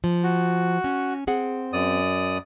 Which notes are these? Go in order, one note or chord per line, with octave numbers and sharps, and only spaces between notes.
F3
F#4
C#4
C4 G#4 F#5
F#2 D5 D#6